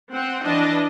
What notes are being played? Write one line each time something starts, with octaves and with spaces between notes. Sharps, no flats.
C4 F#5
E3 D4 D#5